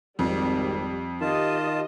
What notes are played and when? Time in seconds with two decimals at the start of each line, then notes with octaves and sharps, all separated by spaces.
0.19 G#1 F2 G3
1.21 D#3 F4 G4 D#5 A5